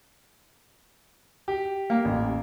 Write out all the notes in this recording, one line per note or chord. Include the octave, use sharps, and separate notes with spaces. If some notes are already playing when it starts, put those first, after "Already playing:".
G4
A#3
A1